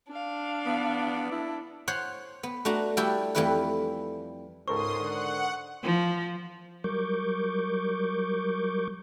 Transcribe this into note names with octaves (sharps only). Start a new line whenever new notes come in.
D4 F5
B3
E4
C5 C#5 F#5
B3
A3 D4 F#4 A#5
G3 A3 E4 F#4 G4 A4
F2 E3 G3 A3 E4 B4
C#2 G#2 A4 A#4 C5 C6 C#6 D#6
D3 F#5
F3
F#3 G3 A#4 C#6 D6 G6